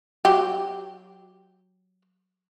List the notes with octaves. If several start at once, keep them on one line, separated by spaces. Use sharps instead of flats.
F#3 G4